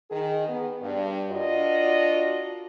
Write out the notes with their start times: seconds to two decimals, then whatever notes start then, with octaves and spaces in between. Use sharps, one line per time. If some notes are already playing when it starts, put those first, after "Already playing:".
0.10 D#3 G#4
0.47 B3
0.81 G2
1.30 D4 F4 F#4 A#4 D5 D#5